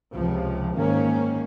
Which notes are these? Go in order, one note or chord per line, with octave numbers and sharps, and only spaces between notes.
C#2 C3 F3
G#2 D#3 A#3 C#4